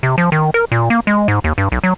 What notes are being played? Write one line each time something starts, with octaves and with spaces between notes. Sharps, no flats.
C3
F3
D#3
A#4
A#2
A#3
G#3
G#2
D#2
G2
B1
F#3